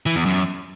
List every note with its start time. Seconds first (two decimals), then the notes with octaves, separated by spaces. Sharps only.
0.06 E3
0.16 E2
0.26 F#2